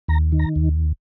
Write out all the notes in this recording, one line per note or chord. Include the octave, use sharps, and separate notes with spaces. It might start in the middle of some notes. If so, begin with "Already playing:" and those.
D#2 A#5
D#3
A#5
D#2